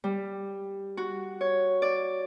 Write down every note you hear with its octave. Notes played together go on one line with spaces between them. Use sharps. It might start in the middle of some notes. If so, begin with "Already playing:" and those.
G3
F#4
C#5
D5